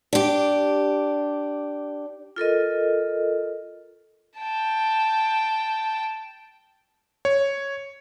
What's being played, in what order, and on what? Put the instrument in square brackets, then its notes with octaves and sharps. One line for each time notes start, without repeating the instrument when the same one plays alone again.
[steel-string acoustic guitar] D4 G4
[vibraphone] F4 A4 A#4 D#5
[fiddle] G5 A5
[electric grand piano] C#5